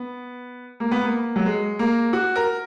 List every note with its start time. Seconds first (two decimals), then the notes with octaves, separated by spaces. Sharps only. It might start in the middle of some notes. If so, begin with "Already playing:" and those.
Already playing: B3
0.80 A#3
0.91 B3
1.04 A#3
1.36 F#3
1.46 G#3
1.79 A#3
2.13 F#4
2.36 A#4